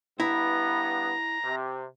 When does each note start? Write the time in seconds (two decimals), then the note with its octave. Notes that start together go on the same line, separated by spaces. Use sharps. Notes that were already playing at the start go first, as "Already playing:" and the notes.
0.20 G2 B3 E4 A#5
1.45 C3